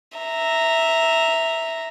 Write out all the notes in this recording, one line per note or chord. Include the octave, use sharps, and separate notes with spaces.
E5 A#5